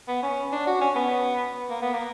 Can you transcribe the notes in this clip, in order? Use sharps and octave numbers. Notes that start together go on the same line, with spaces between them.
B3
C#4
D4
F#4
C#4
B3
A#3
B3
A#3